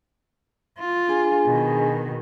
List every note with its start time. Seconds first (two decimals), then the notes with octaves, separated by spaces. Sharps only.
0.79 F4
1.09 D4 G#4 G#5
1.46 B2 D#3